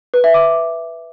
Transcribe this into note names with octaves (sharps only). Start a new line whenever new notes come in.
B4
E5
D6